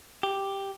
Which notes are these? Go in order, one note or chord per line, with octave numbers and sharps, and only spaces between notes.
G4